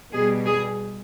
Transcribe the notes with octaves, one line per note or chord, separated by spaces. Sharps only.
B2 G3 G#4
G#4